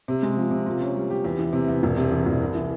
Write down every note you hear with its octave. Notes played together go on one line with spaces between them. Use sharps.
C3
G#3
F3
C3
A#2
C#4
G3
G4
E2
E3
C3
E2
E1
C3
E2
E1
C2
E3